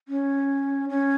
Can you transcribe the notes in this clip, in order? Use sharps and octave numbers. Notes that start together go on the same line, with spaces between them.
C#4
C#4